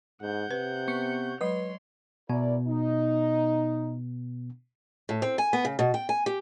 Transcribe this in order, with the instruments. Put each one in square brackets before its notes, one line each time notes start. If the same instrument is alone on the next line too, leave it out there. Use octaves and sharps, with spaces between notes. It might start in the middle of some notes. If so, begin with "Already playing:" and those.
[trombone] G#2 [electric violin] F#5 G6
[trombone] C3 [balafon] B4
[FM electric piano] B3 C#6 C#7
[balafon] F#3 G#3 [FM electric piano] B4 [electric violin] C#5 C6
[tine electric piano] B2 B3 [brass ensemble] E4 A#4 D5
[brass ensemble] D#4
[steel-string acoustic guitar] A2
C4
G#5
B3
C#3
B2
G5
G#5
G4